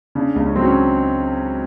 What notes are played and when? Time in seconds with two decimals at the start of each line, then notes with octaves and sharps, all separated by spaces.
0.15 C#3 D4
0.36 C#2
0.46 C#4
0.56 F#3 C4
0.65 C#4